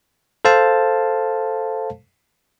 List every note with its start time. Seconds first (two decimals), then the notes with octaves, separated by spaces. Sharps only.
0.45 A4 C5 F5 A5